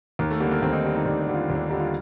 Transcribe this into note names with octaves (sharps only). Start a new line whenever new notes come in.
D#2 A#3
A3
D3 G3 A#3
A#3
D#2 C4
D#4
D3 G3
D#4
D#2 D4
D4
D3 G3
F4
D#2
D4
D3 G3 D#4
F4